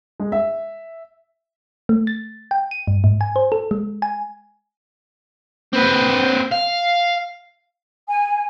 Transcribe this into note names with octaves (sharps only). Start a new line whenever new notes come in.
G#3
E5
A3
A6
G5
D#7
G2
G#2
G#5
C5
A4
G#3
G#5
C4 B4
F5
G#5